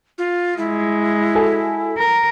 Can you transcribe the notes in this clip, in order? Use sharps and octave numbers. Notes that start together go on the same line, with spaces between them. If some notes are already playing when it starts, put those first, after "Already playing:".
F4
G#3 E4
F#4 A4 G#5
A#4